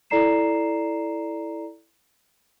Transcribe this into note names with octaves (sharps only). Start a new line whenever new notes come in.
E4 A4 D5 A#5 C7 E7